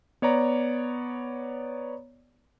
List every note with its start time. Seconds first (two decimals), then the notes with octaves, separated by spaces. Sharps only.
0.22 B3 C#5 D5 A#5